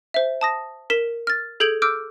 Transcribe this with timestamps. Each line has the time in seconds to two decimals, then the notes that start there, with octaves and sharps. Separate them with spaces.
0.14 C5 E5
0.41 A5 D#6 A#6
0.90 A#4 B6 E7
1.27 F6 A6
1.60 G#4 A4 G6 G#6 D7 F#7
1.82 D6 E6 F6 G6 D7